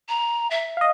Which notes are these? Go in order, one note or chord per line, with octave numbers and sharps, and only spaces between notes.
A#5
E5
D#5 F5